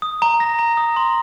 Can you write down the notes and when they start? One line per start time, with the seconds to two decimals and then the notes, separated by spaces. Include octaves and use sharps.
0.02 D#6
0.22 A#5
0.40 A#6
0.59 A#5
0.77 D#6
0.96 C6